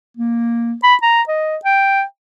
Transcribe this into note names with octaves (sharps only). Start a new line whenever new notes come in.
A#3
B5
A#5
D#5
G5